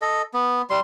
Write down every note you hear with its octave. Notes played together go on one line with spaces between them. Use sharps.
A4 D#5
B3
G3 C6